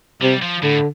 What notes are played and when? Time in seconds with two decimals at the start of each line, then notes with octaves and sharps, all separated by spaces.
0.22 C3 G3
0.42 F3
0.63 A2 D3